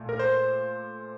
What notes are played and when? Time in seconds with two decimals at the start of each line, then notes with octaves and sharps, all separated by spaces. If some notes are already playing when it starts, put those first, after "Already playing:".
Already playing: A#2 A3
0.09 A#4
0.19 C5